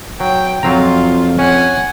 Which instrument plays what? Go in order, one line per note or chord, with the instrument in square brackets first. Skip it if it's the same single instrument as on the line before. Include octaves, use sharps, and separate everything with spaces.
[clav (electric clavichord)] F#3 [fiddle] G5
[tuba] F2 [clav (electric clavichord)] F#3 C4 A#5 [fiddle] F4
[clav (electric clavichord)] C#4 [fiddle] F#5 G#5